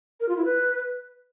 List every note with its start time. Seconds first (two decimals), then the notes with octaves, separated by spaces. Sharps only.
0.20 A#4
0.29 F4
0.37 E4
0.45 B4